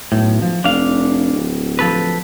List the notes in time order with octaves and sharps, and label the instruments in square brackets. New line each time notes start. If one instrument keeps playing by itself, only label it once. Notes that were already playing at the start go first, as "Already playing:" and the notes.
[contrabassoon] B1 [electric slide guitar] A2
[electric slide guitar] F3
[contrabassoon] F1 [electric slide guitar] D4 F5
[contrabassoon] D1
[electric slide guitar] F3 A4 B4